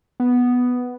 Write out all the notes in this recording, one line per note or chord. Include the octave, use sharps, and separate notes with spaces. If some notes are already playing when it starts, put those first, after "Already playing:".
B3